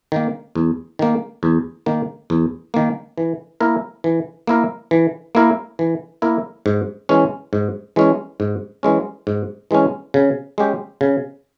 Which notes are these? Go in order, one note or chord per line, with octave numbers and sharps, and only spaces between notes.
D#3 A#3
E2
D#3 A#3
E2
D#3 A#3
E2
D#3 A#3
E3
A#3 E4 A#4
E3
A#3 E4 A#4
E3
A#3 E4 A#4
E3
A#3 E4 A#4
G#2
E3 G#3 C#4
G#2
E3 G#3 C#4
G#2
E3 G#3 C#4
G#2
E3 G#3 C#4
C#3
G#3 C#4 G4
C#3